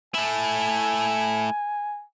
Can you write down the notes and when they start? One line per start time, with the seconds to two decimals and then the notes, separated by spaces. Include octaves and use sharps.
0.14 A3 E4 G#5